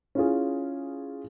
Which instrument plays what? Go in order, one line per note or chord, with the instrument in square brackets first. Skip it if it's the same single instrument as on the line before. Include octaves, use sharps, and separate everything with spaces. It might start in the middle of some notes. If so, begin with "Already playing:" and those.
[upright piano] C#4 E4 F4 G#4